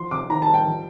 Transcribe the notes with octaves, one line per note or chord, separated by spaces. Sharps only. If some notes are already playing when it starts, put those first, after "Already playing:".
Already playing: F3 C6
C3 D6
D#3 A#5
A5
G3
G5
F3